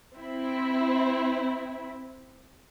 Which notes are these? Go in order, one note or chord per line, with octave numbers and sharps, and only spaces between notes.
C4 E4